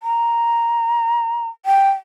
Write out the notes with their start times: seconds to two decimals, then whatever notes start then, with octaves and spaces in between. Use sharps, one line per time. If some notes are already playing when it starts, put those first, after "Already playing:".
0.03 A#5
1.66 G5